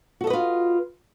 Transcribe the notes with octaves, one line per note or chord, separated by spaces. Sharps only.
F4 F#4 A4 B4 D#5